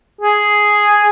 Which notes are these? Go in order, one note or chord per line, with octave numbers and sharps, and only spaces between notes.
G#4